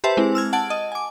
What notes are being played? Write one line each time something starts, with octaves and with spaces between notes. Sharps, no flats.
G4 B4 C5 E5 A5
G#3 C4 E4
E6 F6 G#6
F#5 A5 G#6 D7
D#5 A5
G#5 D6